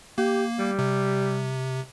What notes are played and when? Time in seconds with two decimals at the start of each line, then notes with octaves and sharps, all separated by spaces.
0.18 A#3 G4
0.59 G3
0.79 C3